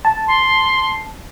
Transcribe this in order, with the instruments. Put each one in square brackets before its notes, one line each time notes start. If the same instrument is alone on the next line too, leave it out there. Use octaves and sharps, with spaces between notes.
[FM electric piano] A5
[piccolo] C6